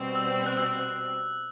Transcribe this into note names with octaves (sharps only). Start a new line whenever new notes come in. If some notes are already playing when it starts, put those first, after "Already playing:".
Already playing: B2 G3 C4
E6
F#6
E6